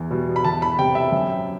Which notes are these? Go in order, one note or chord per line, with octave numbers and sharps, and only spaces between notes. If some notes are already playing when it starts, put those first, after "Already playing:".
Already playing: E2
B2 G3
B5
E2 A5
B5
C3 G3 G5
E5
F#2